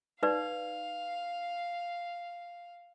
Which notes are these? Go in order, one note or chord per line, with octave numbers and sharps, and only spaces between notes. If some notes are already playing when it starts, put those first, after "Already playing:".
D#4 B4 D5 F5